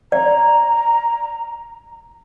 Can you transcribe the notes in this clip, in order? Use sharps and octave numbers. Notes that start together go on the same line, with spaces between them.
D5 A#5